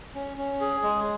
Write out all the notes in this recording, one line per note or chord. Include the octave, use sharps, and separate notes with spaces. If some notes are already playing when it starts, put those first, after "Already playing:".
C#4
C#4
G#4
G#3